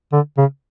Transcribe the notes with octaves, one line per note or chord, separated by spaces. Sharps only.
D3
C#3